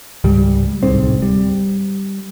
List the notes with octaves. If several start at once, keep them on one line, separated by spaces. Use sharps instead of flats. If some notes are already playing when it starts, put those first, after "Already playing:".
C#2 G#2 G3
D1 C2 G#2 C4
G3